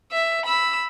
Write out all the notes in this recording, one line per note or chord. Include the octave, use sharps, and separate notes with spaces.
E5
B5 E6